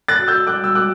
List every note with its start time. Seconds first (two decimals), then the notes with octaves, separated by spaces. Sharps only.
0.08 F#6 A6
0.18 F#4
0.28 E6 G6
0.47 G3 D6 F#6
0.64 E6
0.75 F#4 D6 F#6